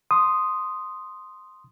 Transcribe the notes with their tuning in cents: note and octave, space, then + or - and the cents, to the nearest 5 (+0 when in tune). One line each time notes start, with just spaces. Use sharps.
C6 +0 D#6 +0